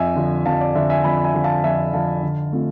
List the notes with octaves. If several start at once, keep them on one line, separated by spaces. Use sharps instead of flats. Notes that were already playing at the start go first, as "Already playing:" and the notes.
Already playing: F2 E5 G#5
D3 F3
F2 F5 A5
D5
D3 F3 E5
E5 G#5
F2 G#5 B5
E5 G#5
D3 F3
F5 A5
F2 E5 G#5
D3 F3 F5 A5
D3
A3 C4 F4